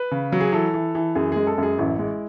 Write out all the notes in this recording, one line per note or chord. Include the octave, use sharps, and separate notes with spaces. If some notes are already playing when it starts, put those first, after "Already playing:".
Already playing: B4
C#3
F#3
G#4
E3 A4
E3
E3
F#2 G#4
G#3 G#4
A4
F#2 G#4
A1 E4
G#3